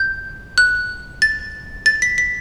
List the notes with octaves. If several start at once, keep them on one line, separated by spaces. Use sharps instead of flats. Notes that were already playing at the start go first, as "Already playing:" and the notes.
Already playing: G6
F#6
A6
A6
B6
B6